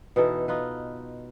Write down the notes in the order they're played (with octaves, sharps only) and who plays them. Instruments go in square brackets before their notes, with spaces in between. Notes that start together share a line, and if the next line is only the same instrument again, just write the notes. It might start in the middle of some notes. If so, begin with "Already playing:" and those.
[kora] B2 E3 D#4 A4
D#4 F4 B4